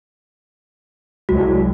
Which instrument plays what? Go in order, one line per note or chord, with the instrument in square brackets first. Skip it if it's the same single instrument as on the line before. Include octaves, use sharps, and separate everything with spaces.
[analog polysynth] C2 F#3 G#3 [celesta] F#4